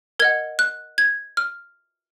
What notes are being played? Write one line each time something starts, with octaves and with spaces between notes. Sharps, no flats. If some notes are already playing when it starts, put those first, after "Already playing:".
A#4 D#5 F#5 G#6
F#6
G#6
F6